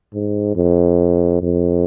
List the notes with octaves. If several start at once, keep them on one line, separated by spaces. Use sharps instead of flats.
G#2
F2
F2